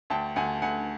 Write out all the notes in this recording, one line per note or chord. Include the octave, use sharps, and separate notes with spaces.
D2 G5 A5
D2 F#5 G#5
D2 F#5 G#5